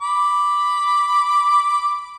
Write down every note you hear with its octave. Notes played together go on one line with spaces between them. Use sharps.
B5 D6